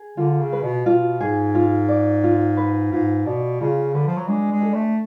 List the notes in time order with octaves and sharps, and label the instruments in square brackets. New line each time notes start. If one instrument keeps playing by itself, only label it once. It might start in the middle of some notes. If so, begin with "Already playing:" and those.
Already playing: [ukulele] G#4
[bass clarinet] D3 [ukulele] F4
[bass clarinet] C#3
[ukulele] B4
[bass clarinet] B2
[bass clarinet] B2 [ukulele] F4
[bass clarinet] G#2 [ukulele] G#4
[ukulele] F4
D5
F4
B4
[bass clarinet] G#2 [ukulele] F4
[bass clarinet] B2 [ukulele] D5
[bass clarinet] C#3 [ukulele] F4
[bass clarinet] D3 [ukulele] B4
[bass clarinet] F3
F#3
[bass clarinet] G#3 [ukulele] D4
[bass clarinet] G#3
[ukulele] A4
[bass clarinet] A3